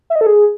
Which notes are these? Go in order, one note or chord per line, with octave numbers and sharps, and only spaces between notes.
E5
D#5
A4
G#4